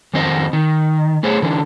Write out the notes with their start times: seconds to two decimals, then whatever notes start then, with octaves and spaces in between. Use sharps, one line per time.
0.14 F2 D#3 C4 C5 D#5
0.53 D#3
1.23 A3 G#4 C5 C#5
1.42 D3 E3 D4